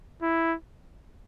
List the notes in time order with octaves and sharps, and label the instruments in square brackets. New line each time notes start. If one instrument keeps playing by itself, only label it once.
[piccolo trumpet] E4